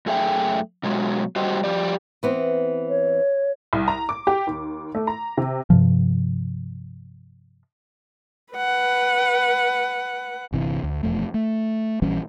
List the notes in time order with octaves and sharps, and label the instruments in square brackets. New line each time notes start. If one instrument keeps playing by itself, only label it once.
[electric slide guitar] F#2 A3 G#4 E5 G5
B2 F#3 G#3
G3 F#4 G4 C5 D#5
F3 G4 D5
[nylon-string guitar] E3 B3 C4
[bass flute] C#5
[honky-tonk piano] C2
A#5
D6
G4
D#2
A3
A#5
C3
[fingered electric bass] G2 C3 F3
[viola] B4 F#5
[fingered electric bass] G1 C3 E3
D2
E1 F2 A3
A3
A#1 E3 G3 C#4